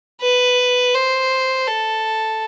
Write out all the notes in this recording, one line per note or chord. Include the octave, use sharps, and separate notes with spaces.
B4
C5
A4